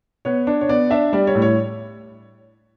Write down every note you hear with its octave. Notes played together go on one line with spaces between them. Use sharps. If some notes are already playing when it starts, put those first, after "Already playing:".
B3 C#5
D4
C#5
B3 D5
D4 E5
G3 D5
C#5
A2
C#5